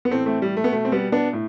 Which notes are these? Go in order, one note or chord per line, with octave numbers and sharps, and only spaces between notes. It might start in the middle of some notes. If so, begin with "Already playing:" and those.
B3
A2 E3 A3 C4
A3 C4
G3
A3
B3
B2 A3
C4
G3 B3
B3 D4
A2